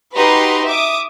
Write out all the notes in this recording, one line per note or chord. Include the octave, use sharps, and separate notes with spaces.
D#4 F#4 G4 B4 A#5 C6
E5 D6 D#6